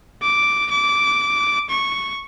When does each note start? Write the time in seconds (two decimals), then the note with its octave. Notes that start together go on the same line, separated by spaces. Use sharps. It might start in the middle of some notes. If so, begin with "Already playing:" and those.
0.22 D6
0.71 D6
1.70 C#6